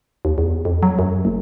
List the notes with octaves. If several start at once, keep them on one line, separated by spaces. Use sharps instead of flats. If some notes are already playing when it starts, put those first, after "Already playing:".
D#2
E2
F2
F#3
F#2
F#1